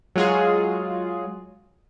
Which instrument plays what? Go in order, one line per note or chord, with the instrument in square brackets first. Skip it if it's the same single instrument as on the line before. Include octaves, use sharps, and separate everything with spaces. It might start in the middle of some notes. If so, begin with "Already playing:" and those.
[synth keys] F#3 G#3 F4 F#4 G#4